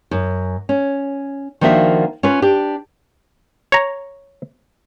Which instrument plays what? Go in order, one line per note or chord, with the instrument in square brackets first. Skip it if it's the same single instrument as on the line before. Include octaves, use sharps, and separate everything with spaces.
[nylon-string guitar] F#2
C#4
D#3 F3 A#3 D4 F#4 E5
C#4 F4 B4
D4 G4
[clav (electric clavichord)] C#5 A#5